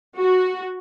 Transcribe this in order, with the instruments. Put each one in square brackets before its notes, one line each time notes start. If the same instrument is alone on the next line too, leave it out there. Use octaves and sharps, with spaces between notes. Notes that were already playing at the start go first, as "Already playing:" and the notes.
[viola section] F#4